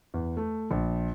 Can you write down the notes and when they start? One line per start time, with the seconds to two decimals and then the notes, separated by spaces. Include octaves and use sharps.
0.14 E2
0.37 A3
0.71 A#1